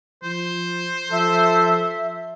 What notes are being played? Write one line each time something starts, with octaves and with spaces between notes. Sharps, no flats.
F3 C5
F3 A4 E5